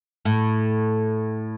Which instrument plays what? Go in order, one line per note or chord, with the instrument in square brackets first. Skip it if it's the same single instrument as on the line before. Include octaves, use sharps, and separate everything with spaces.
[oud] A2